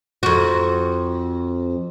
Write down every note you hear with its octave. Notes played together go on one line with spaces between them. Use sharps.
F2 F#4